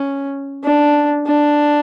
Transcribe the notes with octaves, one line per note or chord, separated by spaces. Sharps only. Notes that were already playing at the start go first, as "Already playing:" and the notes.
Already playing: C#4
D4
D4